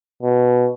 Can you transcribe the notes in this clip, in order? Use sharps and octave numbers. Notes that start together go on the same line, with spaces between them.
B2